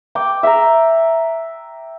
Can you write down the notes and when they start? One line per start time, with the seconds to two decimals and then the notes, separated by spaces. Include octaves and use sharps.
0.15 G5 D6
0.43 E5 F#5 G5 A#5